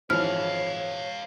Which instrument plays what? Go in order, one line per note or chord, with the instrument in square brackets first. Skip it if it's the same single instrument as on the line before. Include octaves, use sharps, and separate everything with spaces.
[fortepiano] G#1 E3 F3 [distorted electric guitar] B4 F5 [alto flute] C#5 [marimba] F6